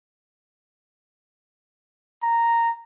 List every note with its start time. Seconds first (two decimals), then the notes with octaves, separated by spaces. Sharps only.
2.23 A#5